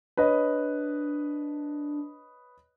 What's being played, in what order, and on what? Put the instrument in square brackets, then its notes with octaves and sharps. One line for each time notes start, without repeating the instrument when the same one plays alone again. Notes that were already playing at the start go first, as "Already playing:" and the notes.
[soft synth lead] D4 [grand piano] B4 C#5 D#5